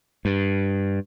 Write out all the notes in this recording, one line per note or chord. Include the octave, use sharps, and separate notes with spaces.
G2